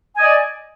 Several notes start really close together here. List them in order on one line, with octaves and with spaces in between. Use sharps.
G#5 D#5 D5